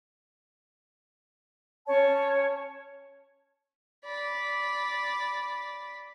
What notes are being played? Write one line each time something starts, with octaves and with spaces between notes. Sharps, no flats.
C#4 C#5 A5
D5 B5